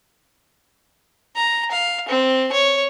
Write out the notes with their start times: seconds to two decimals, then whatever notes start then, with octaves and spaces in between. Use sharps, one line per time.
1.35 A#5
1.71 F5
2.08 C4
2.52 C#5